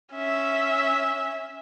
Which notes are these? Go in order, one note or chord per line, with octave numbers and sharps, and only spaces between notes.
C#4 E5